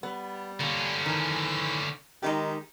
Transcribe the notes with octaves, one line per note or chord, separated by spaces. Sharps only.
G3 B3
A#2 D3 C#4
D#3 E3
D#3 G#3 D#4 G4